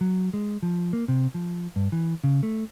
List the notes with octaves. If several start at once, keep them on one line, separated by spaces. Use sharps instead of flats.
F#3
G#3
F3
A#3
C3
F3
G2
E3
C#3
A3